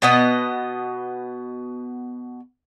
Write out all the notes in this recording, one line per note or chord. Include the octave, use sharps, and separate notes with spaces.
B2 B3 D#5